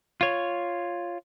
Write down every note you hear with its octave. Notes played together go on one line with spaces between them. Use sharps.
F4 C#5